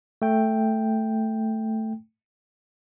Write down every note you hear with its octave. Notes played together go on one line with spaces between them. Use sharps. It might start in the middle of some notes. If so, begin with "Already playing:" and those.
A3 G5